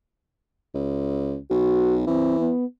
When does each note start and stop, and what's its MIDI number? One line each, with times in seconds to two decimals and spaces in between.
0.74 1.38 37
1.51 2.05 35
1.51 1.96 66
2.07 2.51 52
2.07 2.37 60
2.40 2.65 59